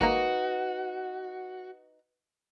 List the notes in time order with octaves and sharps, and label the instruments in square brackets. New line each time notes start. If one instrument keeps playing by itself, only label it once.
[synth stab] G#1 A#3 [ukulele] D#4 B4 A#5 [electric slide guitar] F#4